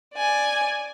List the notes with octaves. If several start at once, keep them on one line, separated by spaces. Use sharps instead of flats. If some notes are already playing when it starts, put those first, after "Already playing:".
D5 G#5